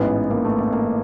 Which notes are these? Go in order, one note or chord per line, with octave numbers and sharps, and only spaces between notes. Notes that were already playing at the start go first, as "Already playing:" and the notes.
Already playing: A1 G#2 E3 B3
A#3
A3
A#3
A#3